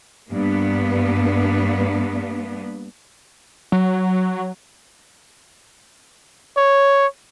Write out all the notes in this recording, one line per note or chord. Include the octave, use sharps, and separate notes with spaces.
G2 A#3 B3 D4
F#3
C#5